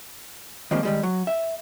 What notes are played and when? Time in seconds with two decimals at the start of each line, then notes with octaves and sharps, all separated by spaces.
0.71 D#3 F3 G3 G#3 A#3 C4
0.83 D#3 G3 G#3
1.03 F#3
1.27 E5